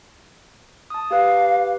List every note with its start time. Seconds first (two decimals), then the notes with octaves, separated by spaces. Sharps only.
0.90 A5 D#6
1.11 G4 B4 F5